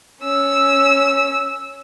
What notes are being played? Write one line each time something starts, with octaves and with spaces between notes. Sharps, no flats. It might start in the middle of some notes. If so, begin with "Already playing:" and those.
C#4 E6